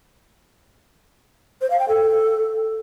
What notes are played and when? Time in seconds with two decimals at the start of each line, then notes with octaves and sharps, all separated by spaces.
1.61 C5
1.70 F5
1.79 G5
1.88 A4